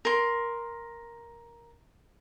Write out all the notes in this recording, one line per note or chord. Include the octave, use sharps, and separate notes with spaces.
A#4 C6